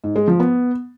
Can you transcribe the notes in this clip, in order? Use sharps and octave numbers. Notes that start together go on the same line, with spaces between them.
G#2
G#3
F3
B3